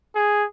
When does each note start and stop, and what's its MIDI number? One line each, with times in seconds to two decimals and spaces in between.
0.15 0.45 68